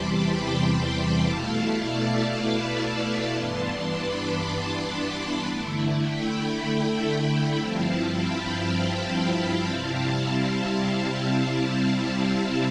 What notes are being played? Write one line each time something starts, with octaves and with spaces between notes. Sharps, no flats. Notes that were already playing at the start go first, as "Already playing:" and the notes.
Already playing: E2 C3 E3 G3 A5 B5 C6 D6
G5 B5
B2 A3 E4 F5 A5
D5 F5
B4 D5
D5 F5
G2 E3 B3 D4 A5 C6
B5 D6
A5 C6
D3 A3 E4
G5 B5
G2 F3 C4 E4 F5 A5
G5 B5
F5 A5
C3 G3 C4 E4 F5 A5